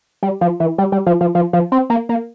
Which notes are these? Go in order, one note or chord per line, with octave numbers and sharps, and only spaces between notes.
G3
F3
E3
G3
G3
F3
F3
F3
F3
C4
A#3
A#3